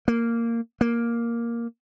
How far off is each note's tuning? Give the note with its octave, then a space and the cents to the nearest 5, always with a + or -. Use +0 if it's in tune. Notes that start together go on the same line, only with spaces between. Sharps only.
A#3 -10
A#3 +5